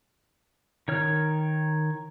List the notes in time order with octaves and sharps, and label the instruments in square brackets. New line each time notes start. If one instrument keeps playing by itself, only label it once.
[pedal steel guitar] D#3 C#5 F6